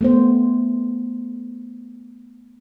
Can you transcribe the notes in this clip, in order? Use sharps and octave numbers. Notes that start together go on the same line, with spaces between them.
A3 B3 C5